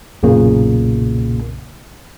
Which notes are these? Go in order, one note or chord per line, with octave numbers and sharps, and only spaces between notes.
B1 F#2 A#2 C#3 A#3